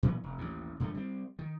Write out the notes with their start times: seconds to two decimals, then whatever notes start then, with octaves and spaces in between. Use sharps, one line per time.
0.03 A#2 E3 F#3 B3
0.24 F1
0.38 A1 D#2
0.80 G2 D3 F3 A3
0.94 G3 C4
1.39 D#3